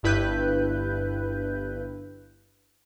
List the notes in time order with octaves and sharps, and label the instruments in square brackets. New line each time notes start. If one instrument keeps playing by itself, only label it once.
[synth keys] G1 G2 E4 B4 F#6 G6